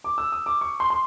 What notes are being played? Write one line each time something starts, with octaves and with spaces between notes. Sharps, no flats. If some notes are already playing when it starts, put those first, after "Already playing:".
D6
E6
D#6
D6
C#6
C6
C6